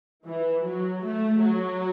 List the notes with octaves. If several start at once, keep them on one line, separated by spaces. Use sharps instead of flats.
E3
F#3
A3
F#3